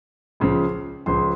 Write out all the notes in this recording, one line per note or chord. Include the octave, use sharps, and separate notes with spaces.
C#2 C#3 F3
C#2 C#3 F3 C6